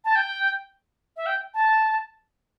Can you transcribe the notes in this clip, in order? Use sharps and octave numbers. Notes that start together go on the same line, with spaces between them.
A5
G5
E5
G5
A5